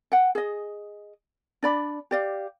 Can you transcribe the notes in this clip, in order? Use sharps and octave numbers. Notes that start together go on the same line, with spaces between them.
F#5 G5
G#4 D#5
D4 D5 B5
G4 D5 F5